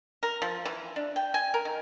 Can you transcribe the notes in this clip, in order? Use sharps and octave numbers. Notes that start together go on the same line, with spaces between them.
A#4
F3
E3
D4
G5
G#5
A#4
D#3